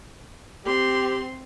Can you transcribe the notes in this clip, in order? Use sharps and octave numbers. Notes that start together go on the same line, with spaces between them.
C4 G4 C6